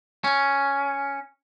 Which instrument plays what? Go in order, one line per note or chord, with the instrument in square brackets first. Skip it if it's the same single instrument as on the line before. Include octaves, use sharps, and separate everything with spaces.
[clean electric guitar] C#4